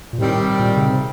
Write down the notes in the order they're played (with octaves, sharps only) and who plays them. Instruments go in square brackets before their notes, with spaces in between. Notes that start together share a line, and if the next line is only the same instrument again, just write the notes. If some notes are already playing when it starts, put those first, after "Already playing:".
[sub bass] A#2
[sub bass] A2 [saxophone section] C3 D#3 G3 C4
[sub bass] A#2
C#3
C3